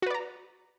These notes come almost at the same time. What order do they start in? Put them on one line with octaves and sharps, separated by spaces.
F#4 B4 D5 A#5